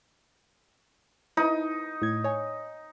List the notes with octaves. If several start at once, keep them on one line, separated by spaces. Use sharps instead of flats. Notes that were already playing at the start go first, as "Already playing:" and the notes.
D#4 E4 B4
A2 G#6
C#5 G#5